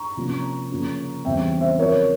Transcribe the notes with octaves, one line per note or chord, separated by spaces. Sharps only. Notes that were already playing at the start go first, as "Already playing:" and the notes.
Already playing: A#5 C#6
C3 F3 A#3 C#4
C#3 F3 A#3 C#4
E2 C#3 G3 C4 E5 G5
C5 E5
C#3 F3 C4 A#4 C#5